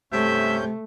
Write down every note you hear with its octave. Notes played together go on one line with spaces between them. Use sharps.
G2 C3 A3 C#4 E5 G6